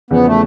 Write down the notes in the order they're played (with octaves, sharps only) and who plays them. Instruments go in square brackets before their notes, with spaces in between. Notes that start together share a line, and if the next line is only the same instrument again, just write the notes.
[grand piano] E2 C#3 F3 [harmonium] B3
[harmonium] A3